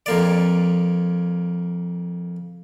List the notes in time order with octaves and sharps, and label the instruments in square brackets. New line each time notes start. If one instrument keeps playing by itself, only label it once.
[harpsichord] F2 A#3 D5